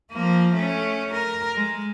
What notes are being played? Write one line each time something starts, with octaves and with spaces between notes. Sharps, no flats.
F3 A#3
A3 C#4
A#4
G#3